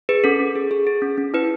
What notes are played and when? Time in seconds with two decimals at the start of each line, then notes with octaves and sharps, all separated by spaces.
0.09 G#4 B4
0.24 C#4 A4
0.40 C#4
0.56 G#4
0.71 G#4
0.87 G#4
1.02 C#4
1.18 C#4
1.34 E4 B4